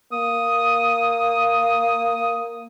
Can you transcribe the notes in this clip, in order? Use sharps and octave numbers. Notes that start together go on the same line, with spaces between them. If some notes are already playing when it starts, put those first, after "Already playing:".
A#3 D#6